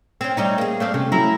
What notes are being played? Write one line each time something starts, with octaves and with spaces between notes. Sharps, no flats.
C4 C#4
G3 A3 C#4 D#4
A#3 G#4
A3 C4 D5 F5
C3 A3 C#4
F#3 A3 E4 A#5